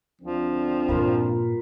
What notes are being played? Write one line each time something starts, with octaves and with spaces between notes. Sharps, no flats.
D2 D3 F3 C4
G2 A#2 F4 A#4 B4